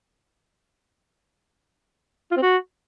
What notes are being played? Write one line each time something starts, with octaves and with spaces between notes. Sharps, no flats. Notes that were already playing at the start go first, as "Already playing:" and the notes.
F4
C4
F#4